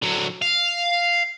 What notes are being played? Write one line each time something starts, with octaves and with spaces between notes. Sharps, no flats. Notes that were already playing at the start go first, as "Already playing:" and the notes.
D3 F#3
F5